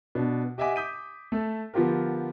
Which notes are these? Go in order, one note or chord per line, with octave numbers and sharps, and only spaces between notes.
B2 D4
G4 D#5 E5 F#5 G#5 D6
D6 D#6 G6 B6 D#7
A3 A4
D3 F3 B3 F4 G4 A#4